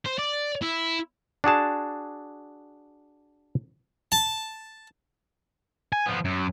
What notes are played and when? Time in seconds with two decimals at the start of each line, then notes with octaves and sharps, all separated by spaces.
0.06 C5
0.19 D5
0.62 E4
1.44 D4 F#4 G#4 A5
4.12 A5
5.93 G#5
6.06 F3 B3
6.25 F#2